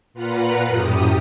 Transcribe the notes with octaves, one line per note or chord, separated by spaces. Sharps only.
A#2 F4 B4 F#5 A#5
F#2 A2 G4 D#6